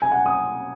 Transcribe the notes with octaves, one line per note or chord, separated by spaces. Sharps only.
G#5
F#5
D#6